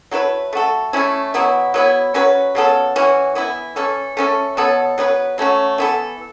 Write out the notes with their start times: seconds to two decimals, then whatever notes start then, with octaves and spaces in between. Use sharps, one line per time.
0.11 F#3 A3 E4 B4
0.53 A3 F#4 A4
0.93 A3 C#4 E4
1.34 B2 F#3 B3 E4
1.74 F#3 B3 E4
2.14 F#3 C#4 F#4 B4
2.55 C#3 F#3 B3 A4
2.96 E3 C#4 F#4
3.35 E3 B3 E4
3.76 E3 C#4 A4
4.17 A3 C#4 A4
4.57 B2 F#3 B3 A4
4.98 F#3 B3 F#4 B4
5.38 F#3 A3 C#4 F#4
5.78 E3 B3 A4